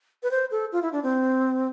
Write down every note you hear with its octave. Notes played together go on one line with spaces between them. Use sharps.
B4
C5
A4
F4
E4
D4
C4